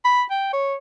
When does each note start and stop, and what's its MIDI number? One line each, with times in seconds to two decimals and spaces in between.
0.05 0.23 83
0.30 0.51 79
0.53 0.75 73